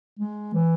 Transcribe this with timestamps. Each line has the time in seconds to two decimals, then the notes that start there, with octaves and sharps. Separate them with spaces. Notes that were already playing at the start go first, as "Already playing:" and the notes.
0.20 G#3
0.54 E3